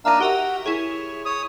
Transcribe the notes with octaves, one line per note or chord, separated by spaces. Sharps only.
A#3 D4 D#4 E5 F5
F#4 G4 A#4 E5
E4 G#4 C#5
C#5 D#6